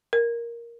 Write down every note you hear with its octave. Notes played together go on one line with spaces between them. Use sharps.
A#4